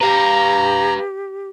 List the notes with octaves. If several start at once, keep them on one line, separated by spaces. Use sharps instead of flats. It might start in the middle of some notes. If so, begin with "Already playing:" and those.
G4 B4 F5 A#5